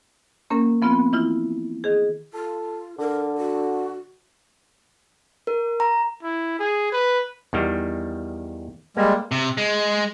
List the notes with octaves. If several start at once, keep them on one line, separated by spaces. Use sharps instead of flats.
A#3 C#4 A#4
F3 B3 C4 F4
E3 E4 F4
D#3 G#4
F4 A4
D3 A#4
F#4
A#4
A#5
E4
G#4
B4
E2 D#3 G3
G3 G#3 A#3
C3
G#3